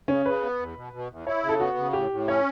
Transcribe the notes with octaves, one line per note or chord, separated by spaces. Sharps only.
C#3 C#4
C#3 B4
B3
E2
B2
B2
E2
E4 C#5
C#3
A4
B3 F#4
C#3
A2 G4
A2
C#4 C#5